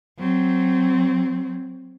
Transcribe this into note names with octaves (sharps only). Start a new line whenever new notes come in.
F#3 C4